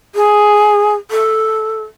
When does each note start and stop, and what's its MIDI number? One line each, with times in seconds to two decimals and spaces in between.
0.15 0.93 68
1.11 1.83 69